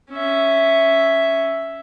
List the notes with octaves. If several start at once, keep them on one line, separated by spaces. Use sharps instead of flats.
C#4 E5